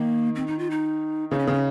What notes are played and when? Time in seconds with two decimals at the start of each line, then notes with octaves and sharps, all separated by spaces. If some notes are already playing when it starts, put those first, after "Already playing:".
Already playing: D#3 A#3
0.36 C4
0.47 D#4
0.59 F4
0.71 D#4
1.31 C#3 D#4
1.39 C#4
1.47 C#3 C4
1.53 C#4